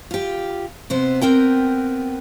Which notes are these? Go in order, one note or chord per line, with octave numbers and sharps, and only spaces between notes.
F4 G4
C3 B3 C5
B3 C4 A#4 G5